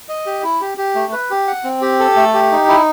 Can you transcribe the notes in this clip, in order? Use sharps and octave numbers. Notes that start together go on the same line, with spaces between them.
D#5
G4
E4
G4
G4
A3
B4
G4
F#5
C4
G4
A4
A3
G4
D#4
E4